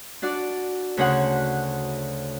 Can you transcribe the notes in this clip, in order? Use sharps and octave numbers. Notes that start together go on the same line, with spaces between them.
D4 F#4 D5
D2 C#3 C#4 C5 C#5 F#5